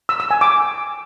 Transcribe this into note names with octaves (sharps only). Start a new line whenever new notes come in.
E6
E6
G#5
D6